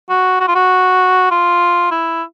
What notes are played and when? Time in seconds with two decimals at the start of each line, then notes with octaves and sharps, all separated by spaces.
0.10 F#4
0.40 F#4
0.48 F4
0.55 F#4
1.31 F4
1.91 E4